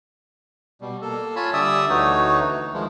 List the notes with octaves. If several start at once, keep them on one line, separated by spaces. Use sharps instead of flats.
B2 G3
A#3 A4
F4 C#5 G#5 A5 B5
D3 G3 D5 E5 D#6 E6
D2 E3 A3 D#4 F#4 C#5
D#3 F3 G#3